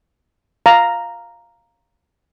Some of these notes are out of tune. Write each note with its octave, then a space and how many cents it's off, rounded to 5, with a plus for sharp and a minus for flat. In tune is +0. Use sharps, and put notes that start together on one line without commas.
F5 +0 A#5 +0